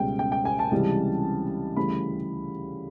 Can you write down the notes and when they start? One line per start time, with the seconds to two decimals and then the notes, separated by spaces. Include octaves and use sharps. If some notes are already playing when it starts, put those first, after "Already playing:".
Already playing: C#2 B2 G3 G5
0.19 G5
0.32 G5
0.45 G#5
0.59 A5
0.71 C#2 C3 E3 G3
1.76 D2 C#3 E3 G3 B5